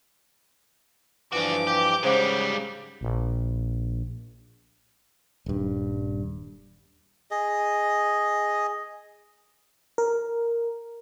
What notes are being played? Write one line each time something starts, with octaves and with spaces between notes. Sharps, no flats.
G2 E3 F3 D4 F#4 D6
G4
G#2 C#3 G3 G#4 C5 F#5
A#1
D#1 G2
G#4 D#5
A#4